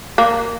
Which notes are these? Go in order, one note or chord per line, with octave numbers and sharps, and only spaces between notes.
A#3